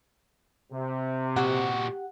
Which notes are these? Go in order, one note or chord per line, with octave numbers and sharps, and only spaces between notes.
C3
A#2 F#4 G4 F#5